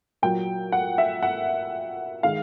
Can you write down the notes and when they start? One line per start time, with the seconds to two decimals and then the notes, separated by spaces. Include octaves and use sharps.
0.22 A#2 F#3 G5
0.72 F#5
0.98 E5
1.23 F#5
2.23 D#3 G#3 F5